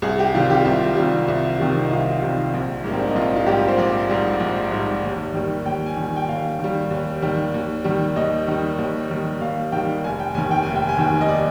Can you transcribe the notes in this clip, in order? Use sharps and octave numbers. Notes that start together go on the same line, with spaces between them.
C2 G#4
G4
C3 D#3 G3 F4
G4
C2 F4
C3 D#3 G3
C2
C3 D#3 G3
D#4
C2 F4
C3 D#3 G3
A#1
G#2 G3 A#3
C4
D4
D#4
A#1 F4
F4
G#2 G3 G4
C5
A#1 D5
G#2 G3
A#1
G#2 G3
D#2
D#3 G3
D#2 G5
G#5
D#3 G3
G5
D#2 F5
D#3 G3
D#2
D#3 G3
D#2
D#3 G3
D#2 D#5
D#3 G3
D#2
D#3 G3
D#2 F5
D#3 G3 G5
F1 G#5
G5
D#2 D#3 G#5
G5
F1 G#5
G5
G#5
D#2 D#3 G5
D#5
D5